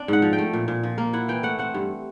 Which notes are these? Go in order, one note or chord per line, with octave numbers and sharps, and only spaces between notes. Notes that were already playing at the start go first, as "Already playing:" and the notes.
Already playing: C4 D4
G#2 F#5
F3
G5
A3
A#2
A#2
F3
A#3
E4 F#5
E3 G5
A3 F#5
C4 F#5
G2